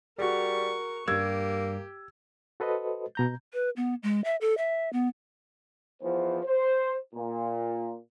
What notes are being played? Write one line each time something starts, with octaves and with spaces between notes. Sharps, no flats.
G3 F#4 G#4 A#4 C#6
G2 G3 A#3 G4 E6 G#6
F#4 A4 B4 C5 D#5
B2 A#5 G6
B4
B3
G#3
E5
A4
E5
B3
E2 E3 F3 B3 C5
C5
A#2